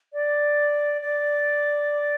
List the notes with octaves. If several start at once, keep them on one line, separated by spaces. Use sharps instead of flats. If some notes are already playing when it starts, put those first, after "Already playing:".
D5
D5